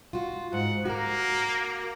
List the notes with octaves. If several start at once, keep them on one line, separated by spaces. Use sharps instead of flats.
F4 F#4
G#2 F#5
A#3 F#4 A#4